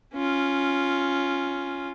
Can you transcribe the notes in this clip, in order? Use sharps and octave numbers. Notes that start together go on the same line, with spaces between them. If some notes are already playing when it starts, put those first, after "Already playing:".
C#4 F4